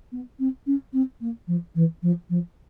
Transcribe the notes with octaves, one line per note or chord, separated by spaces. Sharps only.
B3
C4
C#4
C4
A#3
F3
E3
F3
F3